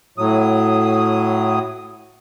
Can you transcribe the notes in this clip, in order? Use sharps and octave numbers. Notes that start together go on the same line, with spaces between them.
A2 F#3 D#6